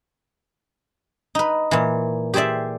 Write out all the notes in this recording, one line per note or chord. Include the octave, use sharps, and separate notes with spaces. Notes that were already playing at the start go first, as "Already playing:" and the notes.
D#4 B4
A#2 E3
G4 G#4 C5 D5 E5